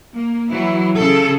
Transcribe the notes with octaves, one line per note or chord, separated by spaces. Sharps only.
A#3
E3 F#3 E4
C#3 G#4 A4